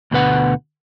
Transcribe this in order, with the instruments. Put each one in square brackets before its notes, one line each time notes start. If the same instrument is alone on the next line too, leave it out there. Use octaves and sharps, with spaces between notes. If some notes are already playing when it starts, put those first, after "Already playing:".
[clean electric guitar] D2 B2 D3 B4 F#5